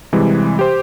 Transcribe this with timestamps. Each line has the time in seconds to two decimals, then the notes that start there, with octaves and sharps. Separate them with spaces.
0.13 C3 E3 G3 G#3
0.59 G4 C5